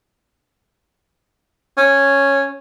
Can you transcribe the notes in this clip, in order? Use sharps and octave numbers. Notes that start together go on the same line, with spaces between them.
C#4